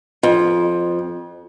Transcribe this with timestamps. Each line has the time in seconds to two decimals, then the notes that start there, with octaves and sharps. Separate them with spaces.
0.23 F2